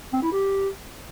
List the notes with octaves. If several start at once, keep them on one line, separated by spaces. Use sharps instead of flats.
C4
E4
G4